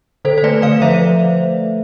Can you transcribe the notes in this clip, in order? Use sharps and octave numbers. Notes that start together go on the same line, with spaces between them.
D3 A4 C5
C5
A3 B4 D5
D3 D5 F5
F3 C5 E5